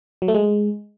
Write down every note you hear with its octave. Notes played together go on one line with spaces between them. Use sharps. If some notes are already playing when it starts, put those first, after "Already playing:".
F#3
A3
G#3